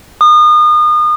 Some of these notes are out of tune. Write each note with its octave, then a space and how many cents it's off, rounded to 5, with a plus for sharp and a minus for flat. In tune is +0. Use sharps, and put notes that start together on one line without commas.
D#6 -35